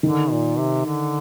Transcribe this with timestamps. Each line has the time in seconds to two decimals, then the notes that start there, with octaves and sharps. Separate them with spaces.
0.03 D3 D#3
0.31 A#2
0.58 C3
0.86 D3